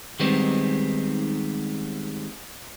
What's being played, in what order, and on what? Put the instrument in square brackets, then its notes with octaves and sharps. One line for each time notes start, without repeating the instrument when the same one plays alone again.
[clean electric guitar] D#3 G3 G#3 B3 C4 D#4